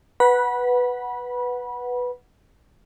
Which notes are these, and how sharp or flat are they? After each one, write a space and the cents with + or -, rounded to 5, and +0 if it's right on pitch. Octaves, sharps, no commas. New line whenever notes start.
B4 +0 F#5 +0 B5 -25